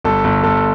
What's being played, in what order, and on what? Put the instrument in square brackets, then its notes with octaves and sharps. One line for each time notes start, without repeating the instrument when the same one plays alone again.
[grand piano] G1 A4
G1
G1 A4